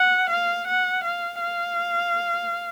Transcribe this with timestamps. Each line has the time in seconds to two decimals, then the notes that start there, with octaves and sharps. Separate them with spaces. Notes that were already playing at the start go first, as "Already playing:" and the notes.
Already playing: F#5
0.30 F5
0.67 F#5
1.04 F5
1.41 F5